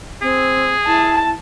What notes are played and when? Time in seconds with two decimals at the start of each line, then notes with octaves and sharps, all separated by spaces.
0.22 C4 G#4
0.87 E4 A5